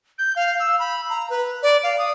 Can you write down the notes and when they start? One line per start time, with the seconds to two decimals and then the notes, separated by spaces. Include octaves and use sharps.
0.19 G6
0.36 F5
0.60 E6
0.79 B5
1.10 A#5
1.30 B4
1.63 D5
1.83 F5
1.98 D#6